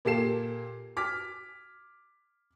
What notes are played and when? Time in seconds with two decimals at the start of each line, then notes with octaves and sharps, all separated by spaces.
0.05 A#2 A#3 G4 A4 C7 E7
0.97 D6 F6 B6